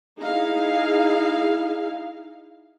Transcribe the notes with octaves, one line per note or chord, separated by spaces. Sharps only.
D#4 E4 G#4 F5